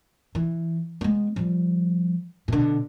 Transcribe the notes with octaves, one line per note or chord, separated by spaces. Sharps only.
E3
G#3 B3
F3 G3
B2 D3